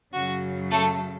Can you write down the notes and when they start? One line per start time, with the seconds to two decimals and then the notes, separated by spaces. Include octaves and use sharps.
0.13 F#2 C#3 F#3 F#4
0.71 A3 A4